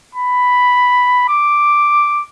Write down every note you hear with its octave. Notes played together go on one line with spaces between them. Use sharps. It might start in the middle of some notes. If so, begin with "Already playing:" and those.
B5
D6